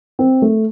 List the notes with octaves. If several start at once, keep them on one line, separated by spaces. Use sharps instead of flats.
C4
A3